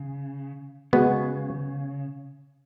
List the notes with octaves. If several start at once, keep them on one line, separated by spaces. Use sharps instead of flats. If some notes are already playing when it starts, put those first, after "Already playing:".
Already playing: C#3
C#3 G#3 B3 F#4